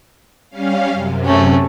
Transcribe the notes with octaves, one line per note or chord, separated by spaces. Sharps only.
G3 C#4 F5
F#2 C3
A3 C#4